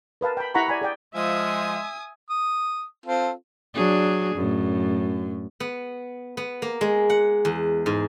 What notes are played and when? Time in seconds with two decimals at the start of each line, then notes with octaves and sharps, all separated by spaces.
0.21 A#4 B4 F5 A5
0.37 G5 B5
0.55 E4 G4 F#5 A#5 B5 C#6
0.68 D5 G#5 B5
0.82 G#4 D5 G5
1.15 F3 G#3 E5 G#5 D#6
2.30 D#6
3.06 C4 F4 A4
3.74 F#3 D4 G#4
4.36 F#2 A2
5.60 B3
6.37 B3
6.62 A#3
6.81 G#3
7.10 F#5
7.45 E2
7.86 G#2